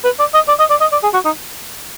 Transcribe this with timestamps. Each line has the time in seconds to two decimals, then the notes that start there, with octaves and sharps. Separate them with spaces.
0.05 B4
0.19 D5
0.34 D#5
0.48 D5
0.59 D#5
0.70 D5
0.81 D#5
0.92 D5
1.03 G#4
1.14 F#4
1.25 D#4